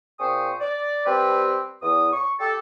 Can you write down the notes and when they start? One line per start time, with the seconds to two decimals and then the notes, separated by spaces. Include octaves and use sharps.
0.19 A#2 C4 G#4 C5 C#6 D#6
0.61 D5
1.06 G3 C4 B4
1.82 E2 D#6
2.13 C#6
2.40 G4 A4